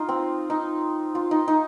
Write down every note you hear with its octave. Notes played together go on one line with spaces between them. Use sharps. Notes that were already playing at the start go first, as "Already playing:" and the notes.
Already playing: D#4 F4
C4
D#4
F4
D#4
D#4